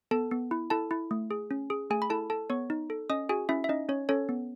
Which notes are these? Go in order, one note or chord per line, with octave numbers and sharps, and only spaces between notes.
B3 A4 A5
B3
E4
E4 A4 A5
E4
A3
G#4
C#4
G#4
A3 G#4 G#5
B5
E4 A4 A5
A4 A5
B3 C#5 C#6
D#4
A4
C#4 D#5 D#6
F#4 G#4 G#5
C#4 E4 E5
E5
C#4 D#4 D#5
C#4 C#5
C#4 A4 C#5
B3